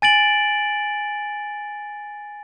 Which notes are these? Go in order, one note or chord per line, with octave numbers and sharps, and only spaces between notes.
G#5 A6 D7 F#7